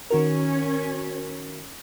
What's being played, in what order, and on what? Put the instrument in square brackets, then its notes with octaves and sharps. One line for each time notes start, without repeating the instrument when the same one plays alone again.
[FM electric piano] D#3 F#4 A#4 [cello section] C#4